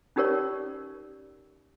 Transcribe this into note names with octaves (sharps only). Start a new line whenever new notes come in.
C#4 D#4 G4 A#4 C#5 D5